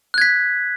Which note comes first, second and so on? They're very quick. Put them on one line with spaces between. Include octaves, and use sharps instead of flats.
F#6 G#6 B6